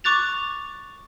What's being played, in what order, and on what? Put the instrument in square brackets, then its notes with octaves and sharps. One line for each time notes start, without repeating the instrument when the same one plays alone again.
[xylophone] C#6 D6 F#6 A6 F7